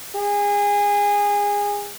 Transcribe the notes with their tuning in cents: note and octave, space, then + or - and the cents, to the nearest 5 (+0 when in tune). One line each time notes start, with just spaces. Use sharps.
G#4 -25